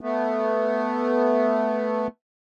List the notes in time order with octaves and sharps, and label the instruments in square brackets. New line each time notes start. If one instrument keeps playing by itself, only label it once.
[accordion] A3 B3